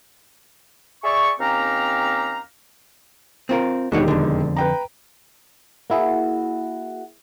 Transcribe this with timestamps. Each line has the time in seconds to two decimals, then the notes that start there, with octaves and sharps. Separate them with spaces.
1.04 G#4 D5 E5 C#6
1.40 D#2 C4 C#4 G4 F5 A#5
3.49 C4 F4 A#4
3.92 E1 D#3 D4 F#4 G4 C#5
4.08 F2 D3
4.56 B4 G5 A#5
5.90 A#3 E4 F#4 G#4 G#5